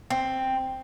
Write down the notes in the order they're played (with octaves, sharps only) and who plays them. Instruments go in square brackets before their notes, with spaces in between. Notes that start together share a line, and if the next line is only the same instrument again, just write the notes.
[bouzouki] C4